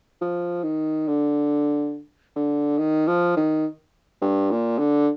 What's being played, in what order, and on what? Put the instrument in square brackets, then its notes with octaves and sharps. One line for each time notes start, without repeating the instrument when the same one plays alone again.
[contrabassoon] F3
D#3
D3
D3
D#3
F3
D#3
G2
A#2
D3